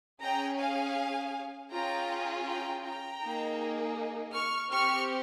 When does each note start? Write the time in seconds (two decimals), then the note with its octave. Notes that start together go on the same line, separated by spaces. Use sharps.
0.22 C#4 G#4 G5 A#5
0.59 F5 G#5
1.72 C#4 F4 G#4 G5 A#5
2.46 G5 A#5
2.84 G5 A#5
3.22 A#3 D#4 G#4
4.33 C#6 F6
4.71 C4 G4 C#6 F6